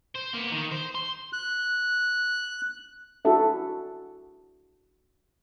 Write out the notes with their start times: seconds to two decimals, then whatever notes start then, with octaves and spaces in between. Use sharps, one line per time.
0.15 C5
0.33 A#3 B3
0.52 D#3
0.72 C5
0.95 C6
1.33 F#6
3.25 D4 E4 F#4 G#4 A4 E5